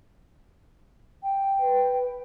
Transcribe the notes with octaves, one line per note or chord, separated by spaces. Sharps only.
G5
B4